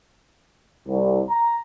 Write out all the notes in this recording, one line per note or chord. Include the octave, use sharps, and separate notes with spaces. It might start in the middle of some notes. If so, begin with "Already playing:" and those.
C2
A#5